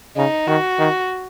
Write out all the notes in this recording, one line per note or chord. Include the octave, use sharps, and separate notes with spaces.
C#3 D#4
D#3 F#4
D#3